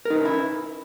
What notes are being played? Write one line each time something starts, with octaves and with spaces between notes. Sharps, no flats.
C#4 D#4 E4 A#4 B4